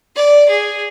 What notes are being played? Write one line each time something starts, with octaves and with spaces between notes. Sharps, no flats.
D5
G#4